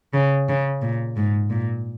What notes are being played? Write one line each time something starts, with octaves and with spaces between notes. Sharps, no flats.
C#3
C#3
A#2
G#2
A#2